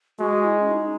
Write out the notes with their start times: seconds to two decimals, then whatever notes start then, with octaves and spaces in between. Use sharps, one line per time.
0.19 G#3 F#4
0.44 E4
0.60 C#4
0.71 D#4